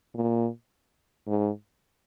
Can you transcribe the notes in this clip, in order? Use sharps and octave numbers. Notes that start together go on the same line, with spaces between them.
A#2
G#2